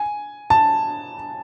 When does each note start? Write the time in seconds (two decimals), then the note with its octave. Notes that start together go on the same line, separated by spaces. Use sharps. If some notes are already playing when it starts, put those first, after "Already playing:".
Already playing: G#5
0.50 A5